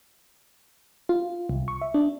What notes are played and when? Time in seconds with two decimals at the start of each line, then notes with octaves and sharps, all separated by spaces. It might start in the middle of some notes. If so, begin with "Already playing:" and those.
1.09 F4
1.49 C2
1.68 C#6
1.81 E5
1.94 D4